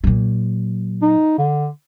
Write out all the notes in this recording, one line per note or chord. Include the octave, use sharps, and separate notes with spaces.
A#2 F#3
D#4
D3